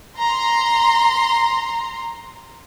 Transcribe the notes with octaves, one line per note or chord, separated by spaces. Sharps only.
A#5 C6